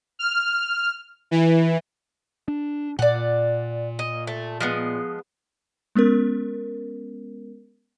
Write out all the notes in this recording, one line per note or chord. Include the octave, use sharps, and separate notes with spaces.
F6
E3
D4
A#2 D5 F#5
D#5
A3
F3 G#3 B3
G#3 B3 C#4 A#4